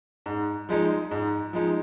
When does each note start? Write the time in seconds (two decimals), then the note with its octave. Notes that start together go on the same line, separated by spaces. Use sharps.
0.26 G#2
0.69 F3 G#3 D#4
1.11 G#2
1.53 F3 G#3 D#4